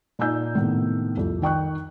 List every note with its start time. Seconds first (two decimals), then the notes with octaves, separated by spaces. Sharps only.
0.19 A#2 D#4 G#5 E6 G6
0.55 A2 C3 D#3 B3
1.17 C2 F2
1.42 D#3 G5 C#6 F#6